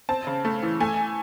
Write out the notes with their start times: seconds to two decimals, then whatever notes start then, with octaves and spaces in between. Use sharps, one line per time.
0.09 C4 A5
0.27 C#3
0.45 A3
0.63 E3
0.80 A3 G#5